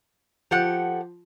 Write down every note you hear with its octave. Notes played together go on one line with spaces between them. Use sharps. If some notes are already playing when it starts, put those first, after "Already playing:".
F3 G4 A4 F#5